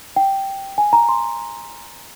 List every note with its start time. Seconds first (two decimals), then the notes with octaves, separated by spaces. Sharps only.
0.16 G5
0.78 G#5
0.93 A#5
1.09 C6